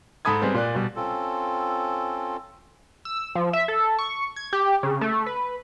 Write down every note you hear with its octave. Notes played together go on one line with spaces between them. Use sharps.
G#2 A4 B5 D#6 G#6
G3 G#3 B3 C4
A#2 D5 F#6
B2 G3
C4 C#4 F4 A4
E6
F3
E5
A4
C#6
G#6
G4
C#3
A3
B4